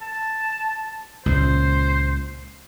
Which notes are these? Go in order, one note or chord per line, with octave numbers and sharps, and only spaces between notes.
A5
C#2 A#2 C5